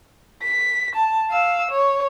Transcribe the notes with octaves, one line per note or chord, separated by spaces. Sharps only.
B6
A5
F5 E6
C#5